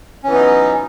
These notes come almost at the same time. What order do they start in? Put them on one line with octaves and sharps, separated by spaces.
C#4 E3 B3 D#4 F#3